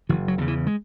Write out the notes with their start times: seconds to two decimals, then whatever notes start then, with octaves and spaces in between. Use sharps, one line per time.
0.09 F#1 E3
0.28 F#3
0.38 E2 C#3
0.48 E3
0.67 G#3